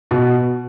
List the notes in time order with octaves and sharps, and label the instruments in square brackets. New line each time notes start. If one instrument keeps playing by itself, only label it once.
[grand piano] B2